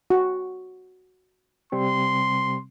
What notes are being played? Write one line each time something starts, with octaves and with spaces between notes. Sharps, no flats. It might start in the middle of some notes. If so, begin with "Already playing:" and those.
F#4
C3 G3 C4 C6